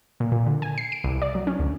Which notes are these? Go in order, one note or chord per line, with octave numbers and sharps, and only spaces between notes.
A#2
A#2
D3
G#5
C7
D7
C2
D5
F#3
C#4
D2